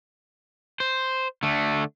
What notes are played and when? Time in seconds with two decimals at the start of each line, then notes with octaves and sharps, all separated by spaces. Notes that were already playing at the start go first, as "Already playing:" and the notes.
0.80 C5
1.43 D3 A3